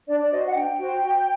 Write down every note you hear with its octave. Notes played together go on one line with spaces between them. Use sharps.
D4 D5
D5
F#4 C5 D#5
F#5
D4 G5
F#4 C5
F#4